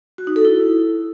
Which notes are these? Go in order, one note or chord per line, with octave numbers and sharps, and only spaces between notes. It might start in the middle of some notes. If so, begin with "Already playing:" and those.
F#4
D#4
A4
E4